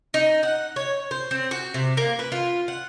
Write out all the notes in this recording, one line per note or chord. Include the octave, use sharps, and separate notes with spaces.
D#4
F#5
C#5
C5
C4
F#4
C3
A#3
B4
F4
F#5